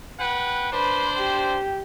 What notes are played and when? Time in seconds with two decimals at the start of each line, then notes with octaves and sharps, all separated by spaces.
0.19 B4 F#5 G5
0.72 D4 B4 C5
1.17 G4